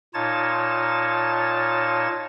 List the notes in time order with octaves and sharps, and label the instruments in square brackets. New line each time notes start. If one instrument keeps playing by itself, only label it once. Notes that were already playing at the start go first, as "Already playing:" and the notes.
[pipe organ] A#2 D#4 F4 C#5 A5 A6